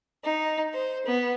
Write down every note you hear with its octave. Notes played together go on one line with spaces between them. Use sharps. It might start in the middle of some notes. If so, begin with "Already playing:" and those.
D#4
C5
B3